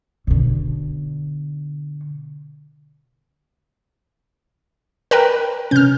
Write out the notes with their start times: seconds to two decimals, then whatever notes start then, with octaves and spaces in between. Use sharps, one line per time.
0.27 B2 D3
5.11 A#4 B4 G5
5.71 C3 C#4 F6 G6